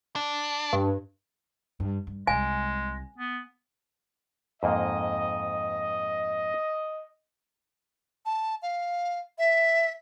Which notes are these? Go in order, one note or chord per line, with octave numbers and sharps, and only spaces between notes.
D4
G2
G2
G2
C2 C3 G#3 G#5
B3
F2 G#2 A#3 D#5
A5
F5
E5